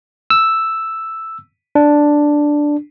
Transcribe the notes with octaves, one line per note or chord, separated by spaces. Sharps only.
E6
D4